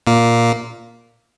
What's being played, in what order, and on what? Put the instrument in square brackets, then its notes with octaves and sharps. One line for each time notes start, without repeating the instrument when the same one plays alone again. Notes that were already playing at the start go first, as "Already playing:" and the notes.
[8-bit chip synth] A#2 A#3